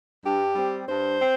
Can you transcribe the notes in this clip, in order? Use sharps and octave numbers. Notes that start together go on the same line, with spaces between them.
G2 G4
G3 C4
G2 C5
C4